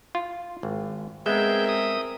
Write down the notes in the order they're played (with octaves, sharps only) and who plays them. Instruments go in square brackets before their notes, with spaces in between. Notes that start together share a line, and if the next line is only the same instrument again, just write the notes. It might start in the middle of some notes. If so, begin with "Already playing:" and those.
[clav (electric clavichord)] F4
G#1
[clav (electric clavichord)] G#3 B3 [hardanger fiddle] C4 A#4 [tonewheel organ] G#4 G6 [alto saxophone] E5
[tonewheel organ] D#6